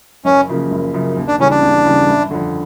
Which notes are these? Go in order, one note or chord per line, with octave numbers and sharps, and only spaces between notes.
F#1 C#4
F#2 C#3 F3 A#3
F#1
F#2 C#3 F3 A#3
D#2
D4
C#3 E3 G3 C#4
D4
D#2
C#3 E3 G3
G1
F2 D3